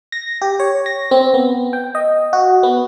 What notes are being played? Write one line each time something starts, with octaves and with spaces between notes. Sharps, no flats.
A#6
G4
C#5
A#6
C4
B3
G5
D#5
F#4
B3